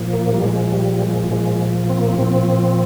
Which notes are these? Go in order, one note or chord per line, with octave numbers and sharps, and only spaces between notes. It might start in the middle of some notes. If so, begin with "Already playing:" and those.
Already playing: A#2 F3
A#3
G3
A#2 F3 G#3
G3
G#3
A#2 F3 G#3
C4
A#3
C4
A#2 F3 C4